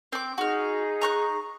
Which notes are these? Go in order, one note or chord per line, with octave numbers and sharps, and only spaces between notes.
C4 D6
D#4 F#4 G#4 F6
A#5 C#6 F#6